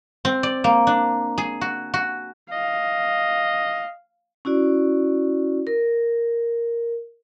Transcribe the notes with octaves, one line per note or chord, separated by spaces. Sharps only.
C4
D5
A#3
D4
G#4
F#4
F#4
D#5 F5
C#4 E4 F#4 D5
A#4